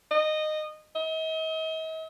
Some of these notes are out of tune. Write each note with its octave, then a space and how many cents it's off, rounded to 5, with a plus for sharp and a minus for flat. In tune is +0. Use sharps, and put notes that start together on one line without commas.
D#5 -15
D#5 +45